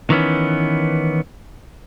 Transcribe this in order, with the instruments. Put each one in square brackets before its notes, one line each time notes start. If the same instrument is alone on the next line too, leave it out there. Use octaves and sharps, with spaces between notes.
[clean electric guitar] D#3 E3 B3 C#4